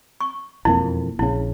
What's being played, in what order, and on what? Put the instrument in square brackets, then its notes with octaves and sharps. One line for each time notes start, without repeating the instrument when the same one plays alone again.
[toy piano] C#6
[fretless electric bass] E1 F2 A#3 [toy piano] E4
[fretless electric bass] A#1 C#3 [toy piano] E4